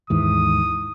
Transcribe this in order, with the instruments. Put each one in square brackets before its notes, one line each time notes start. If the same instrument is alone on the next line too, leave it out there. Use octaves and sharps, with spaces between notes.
[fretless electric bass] D#2 G#2 E3 [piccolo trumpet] D#6